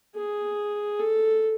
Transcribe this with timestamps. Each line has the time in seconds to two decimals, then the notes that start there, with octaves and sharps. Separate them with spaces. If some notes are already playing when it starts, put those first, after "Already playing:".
0.15 G#4
1.00 A4